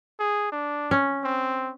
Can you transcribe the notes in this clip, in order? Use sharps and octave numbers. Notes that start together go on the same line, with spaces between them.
G#4
D4
C#4
C4